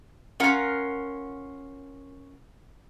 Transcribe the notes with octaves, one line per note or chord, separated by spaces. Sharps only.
C#4 F4 A#4 F#5